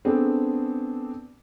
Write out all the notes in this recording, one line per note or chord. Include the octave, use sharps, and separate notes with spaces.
B3 C4 D4 G#4 A4